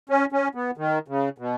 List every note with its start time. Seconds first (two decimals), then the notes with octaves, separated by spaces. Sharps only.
0.09 C#4
0.32 C#4
0.55 B3
0.77 D#3
1.08 C#3
1.38 B2